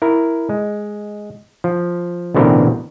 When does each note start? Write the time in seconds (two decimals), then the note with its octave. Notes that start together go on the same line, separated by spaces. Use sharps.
0.02 E4 A#4
0.49 G#3
1.64 F3
2.34 A1 B2 D3 C4 E4 A#4